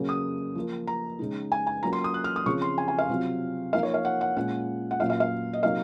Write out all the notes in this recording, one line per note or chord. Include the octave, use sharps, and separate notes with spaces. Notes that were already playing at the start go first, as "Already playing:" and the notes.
Already playing: C#3 F#3 A#3 C#4
D#6
F3 A#3 F4
A#5
C#3 G#3 D#4
G#5
G#5
F#3 A#3 C#4 F4 A#5
C6
D#6
F#6
F6
D#6
C#3 F3 C4 F4 C#6
C6
G#5
G#5
F5
C3 F#3 C4 F4
F3 A#3 D#4 F5
C#5
F5
F#5
F#5
A#2 G#3 C#4 F4 F#5
F#5
A#2 F#3 C#4 F4 F5
F5
F5
D#5
C3 F#3 A#3 D#4 F5